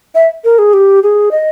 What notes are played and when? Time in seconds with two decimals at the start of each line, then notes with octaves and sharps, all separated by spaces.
0.15 E5
0.44 A#4
0.59 G#4
0.74 G4
1.03 G#4
1.31 D#5